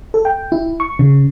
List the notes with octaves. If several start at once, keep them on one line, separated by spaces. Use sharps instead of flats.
A4
G5
E4
C#6
C#3